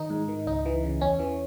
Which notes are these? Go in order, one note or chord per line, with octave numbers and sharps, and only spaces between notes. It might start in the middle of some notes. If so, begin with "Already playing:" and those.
Already playing: D#3 D#4
G#2
D#3
C#2 D#4
E3
C#3
E2 C#4
E3